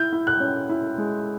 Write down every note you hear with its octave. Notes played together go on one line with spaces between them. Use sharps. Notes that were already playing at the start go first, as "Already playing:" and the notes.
Already playing: E4 G6
E4
F#6
C#4
E4
G#3